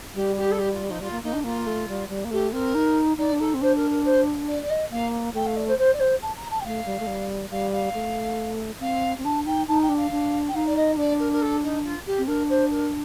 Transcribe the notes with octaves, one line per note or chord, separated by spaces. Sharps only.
G3 G4
G4
A4
G4
F4
F3 D#4
G3 F4
A#3
A#3 D#4
D4
A#3 F4
A3
G3
G3
A#3
A3 G4
C4 A#4
D#4
D#4 D5
D4
D#4 A4
C4
D4 C5
A#4
A#4
C5
D5
D5
D#5
A#3 F5
A3 G5
F5
D5
C5
C5
D5
C5
A5
A#5
A5
G5
A3 F5
G3
A3
G3
G3 F5
F5
A3
C4 F5
C4
D4 A5
D#4 G5
D#4 A5
G5
D4
F5
D4
G5
D#4 F5
D5
D#5
D4 D5
A#4
A#4
A4
D#4
F4
G4
C4
D4 A#4
C5
A#4